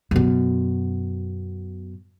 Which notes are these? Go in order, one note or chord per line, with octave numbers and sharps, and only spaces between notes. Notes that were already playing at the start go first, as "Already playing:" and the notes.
F#2 B2